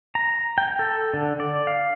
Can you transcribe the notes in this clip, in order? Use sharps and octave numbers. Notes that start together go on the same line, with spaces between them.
A#5
G5
A4
D3
D5
F5